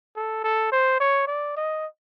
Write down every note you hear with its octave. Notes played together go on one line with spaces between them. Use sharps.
A4
A4
C5
C#5
D5
D#5